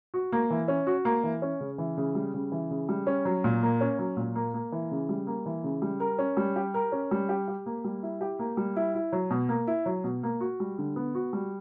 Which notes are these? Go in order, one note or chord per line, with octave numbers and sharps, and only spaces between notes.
F#4
A#3
E3
C#4
F#4
A#3
E3
C#4
C#3
E3
C#3
G3
C#3
E3
C#3
G3
C#4
F#3
A#2
A#3
C#4
F#3
A#2
A#3
A#3
E3
C#3
G3
A#3
E3
C#3
G3
A#4
C#4
G3
G4
A#4
C#4
G3
G4
G4
A#3
G3
E4
G4
A#3
G3
E4
E4
F#3
B2
A#3
E4
F#3
B2
A#3
F#4
G3
D3
B3
F#4
G3